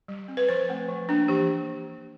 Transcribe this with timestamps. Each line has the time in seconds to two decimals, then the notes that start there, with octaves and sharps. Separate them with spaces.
0.08 G3
0.28 C4
0.37 B4
0.49 F3 C5
0.69 A3 C4
0.88 F3
1.09 A#3 D4
1.28 E3 G4